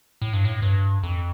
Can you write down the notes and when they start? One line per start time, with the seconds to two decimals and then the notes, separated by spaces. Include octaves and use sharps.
0.22 A2
0.33 G2
0.45 A2
0.62 G2
1.03 F2